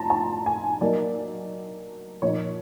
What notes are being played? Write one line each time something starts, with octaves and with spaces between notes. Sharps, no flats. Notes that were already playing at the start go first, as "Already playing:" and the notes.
Already playing: A2 F3 A5 A#5 C6
A5
G#5
F#3 A#3 D#4 D5
A#2 F3 A#3 D#4 C#5